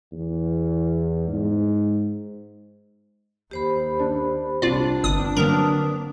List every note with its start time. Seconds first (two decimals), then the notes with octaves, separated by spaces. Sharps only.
0.12 E2
1.28 G#2
3.51 D#2 G4 C5 B5
3.99 D4
4.62 C2 C4 D4 F4 D5
5.03 G1 D#6
5.37 D3 F#3 A#3 A#4 B4 A5 D#6